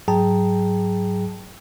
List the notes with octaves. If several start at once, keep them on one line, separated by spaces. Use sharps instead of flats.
G#2 F#3 G#4 G5 A5 A#5